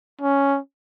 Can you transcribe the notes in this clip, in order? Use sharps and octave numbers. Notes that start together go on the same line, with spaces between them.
C#4